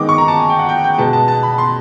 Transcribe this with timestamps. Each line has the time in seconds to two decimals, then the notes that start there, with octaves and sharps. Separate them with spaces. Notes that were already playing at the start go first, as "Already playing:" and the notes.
Already playing: D#3 G#3 B3 D#4 D6
0.09 C#6
0.18 A#5
0.28 A5
0.39 G#5
0.49 G5
0.59 F#5
0.69 G5
0.84 G5
0.98 B2 G#3 B3 A5
1.13 A5
1.28 A5
1.43 B5
1.58 C6